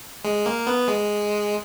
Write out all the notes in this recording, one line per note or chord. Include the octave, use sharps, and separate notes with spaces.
G#3
A#3
B3
G#3